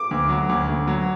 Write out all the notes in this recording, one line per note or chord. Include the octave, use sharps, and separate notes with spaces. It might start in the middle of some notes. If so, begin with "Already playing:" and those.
Already playing: D6
D2
F#3
D2
D2
F#3